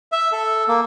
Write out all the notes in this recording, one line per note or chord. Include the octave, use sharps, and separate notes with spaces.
E5
A4
A#3